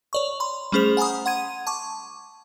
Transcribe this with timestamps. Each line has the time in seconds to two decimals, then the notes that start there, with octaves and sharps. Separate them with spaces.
0.13 C#5 D5 C#6
0.40 B5 C6
0.72 G3 A3 C#4 G#4 C5 F7
0.97 F#5 G#5 A#5 B5 D#6
1.26 F#5 C6 G#6 D#7
1.67 A5 C#6 D6